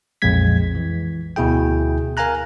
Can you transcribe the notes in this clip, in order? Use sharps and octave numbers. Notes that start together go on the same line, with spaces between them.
B1 F2 A#2 G#3 G#6 B6
E3
D2 B2 E4 G#4 G5
A#4 F5 G#5 A#5 F#6